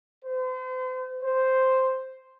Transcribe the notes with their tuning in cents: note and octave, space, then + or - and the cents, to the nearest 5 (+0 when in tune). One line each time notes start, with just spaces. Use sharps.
C5 -40
C5 +0